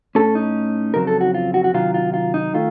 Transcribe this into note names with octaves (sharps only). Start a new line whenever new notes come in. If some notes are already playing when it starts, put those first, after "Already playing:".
A2 A3 C#4 A4
D#4
F2 C#3 F#3 C4 A#4
A4
F#4
F4
F#4
F#4
C3 D#3 F#3 F4
F4
F4
D#4
D#3 A3 F4